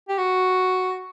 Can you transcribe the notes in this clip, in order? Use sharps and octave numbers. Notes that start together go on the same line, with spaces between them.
G4
F#4